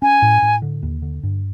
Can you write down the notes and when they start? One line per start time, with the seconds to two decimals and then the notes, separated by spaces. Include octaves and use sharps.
0.02 C#4 G#5
0.22 A2
0.42 A2
0.62 D3
0.83 D#2
1.02 D3
1.23 G2